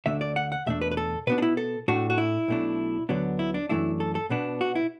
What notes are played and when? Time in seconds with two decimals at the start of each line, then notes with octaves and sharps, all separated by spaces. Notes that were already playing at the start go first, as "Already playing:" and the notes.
0.06 D2 D3 A3 D4 E5
0.21 D5
0.36 F#5
0.52 F#5
0.66 E2 B2 A3 D4 E5
0.81 B4
0.91 B4
0.97 A4
1.27 B2 B3 D4 B4
1.38 D4
1.42 E4
1.57 A4
1.88 A2 A3 D4 F#4
2.10 F#4
2.18 E4
2.48 B1 B2 A3 D4
3.09 D2 D3 F#3 B3 D4
3.39 E4
3.54 D4
3.69 F#2 E3 A3 D4 E4
4.00 A4
4.15 A4
4.30 B2 B3 D4
4.61 F#4
4.75 E4